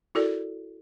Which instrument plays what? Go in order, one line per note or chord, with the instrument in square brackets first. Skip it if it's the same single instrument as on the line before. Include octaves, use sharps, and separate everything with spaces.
[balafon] E4 F#4 A4 A#4 D5